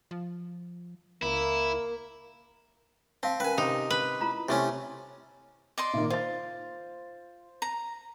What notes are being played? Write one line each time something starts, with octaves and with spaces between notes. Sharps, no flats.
F3
C#2 A#3 E4
C4 F5 A5
C#4 A#4 B4 G#5
C3 D#4
B4
E4 F4 A#5
C3 A3 C#4 E4 C#5 C6
D5 D#5 C6
A#2 D#3 A#3
F4 C5 A6
A#5